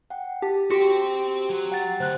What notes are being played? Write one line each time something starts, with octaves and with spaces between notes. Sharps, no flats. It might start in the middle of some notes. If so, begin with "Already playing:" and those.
F#5 G5
G4 A5
F#4 G4 C5 G5 C#7
F#3
F#5 G5 A6
D2 C5 F#6